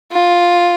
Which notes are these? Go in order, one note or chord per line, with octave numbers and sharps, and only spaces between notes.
F4